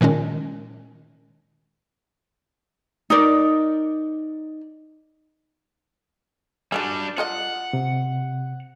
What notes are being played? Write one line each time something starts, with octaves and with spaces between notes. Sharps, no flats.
A#2 D#3 G#3 C#4
D#4 A#4 D5
D3 G3 D4 F#4 G#4
F4 A4 D#5 F#5
C3